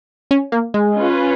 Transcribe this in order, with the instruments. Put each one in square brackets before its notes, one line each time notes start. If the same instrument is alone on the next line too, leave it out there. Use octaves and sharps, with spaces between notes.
[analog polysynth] C#4
A#3
G#3
[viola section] C#4 F4 B4